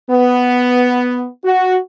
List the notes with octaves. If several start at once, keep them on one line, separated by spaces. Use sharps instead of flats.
B3
F#4